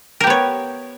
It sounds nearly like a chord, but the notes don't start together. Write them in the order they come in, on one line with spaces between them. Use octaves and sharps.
A#4 G4 B3 C#5